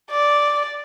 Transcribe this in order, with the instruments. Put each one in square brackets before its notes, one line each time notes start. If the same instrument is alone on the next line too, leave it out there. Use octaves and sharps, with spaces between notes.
[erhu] D5